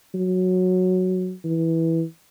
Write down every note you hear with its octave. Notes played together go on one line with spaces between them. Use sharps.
F#3
E3